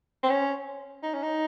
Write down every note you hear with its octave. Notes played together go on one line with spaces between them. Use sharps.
C4
C#4
D#4
C#4
D#4